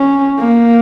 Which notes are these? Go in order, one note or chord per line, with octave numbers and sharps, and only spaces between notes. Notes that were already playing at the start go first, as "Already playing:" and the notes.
Already playing: C#4
A#3